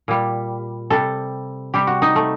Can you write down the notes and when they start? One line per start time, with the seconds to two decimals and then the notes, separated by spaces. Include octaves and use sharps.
0.08 A#2 G3
0.90 C3 G3 A4
1.74 C3 G3 G4
1.87 F#4
2.02 D#4
2.16 A3